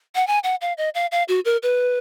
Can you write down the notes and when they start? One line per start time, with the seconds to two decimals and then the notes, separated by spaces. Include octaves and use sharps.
0.15 F#5
0.27 G#5
0.44 F#5
0.61 F5
0.78 D#5
0.95 F5
1.12 F5
1.28 F#4
1.45 A#4
1.63 B4